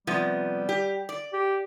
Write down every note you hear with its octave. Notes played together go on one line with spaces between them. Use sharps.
C3 F3 G3 B3
G4
D5
G4